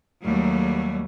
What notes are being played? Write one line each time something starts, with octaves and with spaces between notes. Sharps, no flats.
D#2 F#3 G3 A3